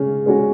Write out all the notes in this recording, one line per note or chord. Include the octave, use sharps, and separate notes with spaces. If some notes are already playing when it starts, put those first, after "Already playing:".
Already playing: C#3 G#3 C#4
G#3 C#4 F#4